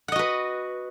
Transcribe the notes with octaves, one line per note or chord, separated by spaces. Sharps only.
F#4 B4 D#5 F#5